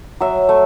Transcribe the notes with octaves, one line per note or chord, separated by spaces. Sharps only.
F#3 E5
A3